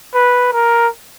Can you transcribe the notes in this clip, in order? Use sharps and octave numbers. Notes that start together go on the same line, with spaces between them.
B4
A#4